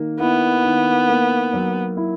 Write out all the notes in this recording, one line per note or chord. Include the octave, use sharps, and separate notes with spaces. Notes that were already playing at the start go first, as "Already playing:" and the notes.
Already playing: D#3 A#3
B3 E4
D#3
A#3
F#3
E4